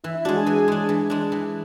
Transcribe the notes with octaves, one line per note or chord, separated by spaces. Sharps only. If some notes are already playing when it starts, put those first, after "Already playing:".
E3 E4 E5
E4 E5
G#3 D4 F#4 F#5
G#4 G#5
E3
G#3 D4
E3
G#3 D4
E3